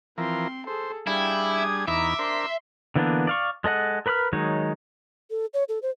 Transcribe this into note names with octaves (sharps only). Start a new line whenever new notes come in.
E3 F3 C4 A#4 C6
G#4 A4 C5
G3 D4 E4 G#4 F5 G5
D#6 G#6
E2 D#4 E5 A#5 B5 D6
D4 A#4 C5 C6
D3 E3 A#3 B3 D4
D5 F5 C#6
G#3 A4 D#5 F#5
A#4 B4 B5 D6 F6
D#3 F#3 G#3 D#4 C#5
A4
C#5
A4
C5